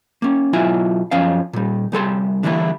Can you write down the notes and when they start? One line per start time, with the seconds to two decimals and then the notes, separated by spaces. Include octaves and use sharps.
0.22 A#3 C#4
0.53 B2 F#3 E4 F4 E5 G#5
1.11 F#2 F3 C#4 F5
1.53 A#2 G3
1.92 C2 G3 A4 C6
2.43 D3 E3 G3 A#3 E4